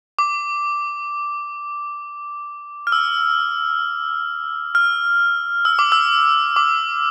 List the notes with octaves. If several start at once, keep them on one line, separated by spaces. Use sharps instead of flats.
D6
F6
E6
F6
E6
D6
E6
D6